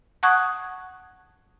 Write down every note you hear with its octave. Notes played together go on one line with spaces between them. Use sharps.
F#5 A5 C#6 D#6 F#6 G#6